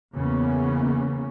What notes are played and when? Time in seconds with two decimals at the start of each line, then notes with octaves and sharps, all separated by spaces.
0.14 E2 C#3 A#3 B3 C#4